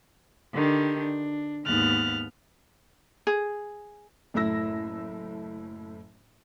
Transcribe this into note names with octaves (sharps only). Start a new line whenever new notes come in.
D3 D#3 D4 G4
D4
D#2 G#2 B3 F6 F#6 A6
G#4
F#1 A2 A3 E4 E6 A#6